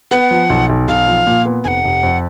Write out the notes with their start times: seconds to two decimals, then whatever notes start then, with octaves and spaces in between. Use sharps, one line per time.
0.11 B3 F#5
0.31 F3
0.50 B1
0.69 B1
0.88 B1 F5
1.07 F3
1.27 A#2
1.45 B3
1.64 F1 F#5 G#5
1.84 F1
2.03 F2